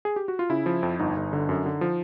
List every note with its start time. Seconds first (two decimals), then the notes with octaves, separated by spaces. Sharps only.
0.05 G#4
0.16 G4
0.28 F#4
0.39 F4
0.50 C#3 E4
0.66 F3
0.83 F2
0.99 G1 D#4
1.16 G1
1.33 D3
1.49 F#2
1.66 D3
1.81 F3